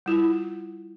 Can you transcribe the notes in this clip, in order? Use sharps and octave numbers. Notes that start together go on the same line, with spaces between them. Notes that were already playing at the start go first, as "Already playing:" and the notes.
G3 E4 F4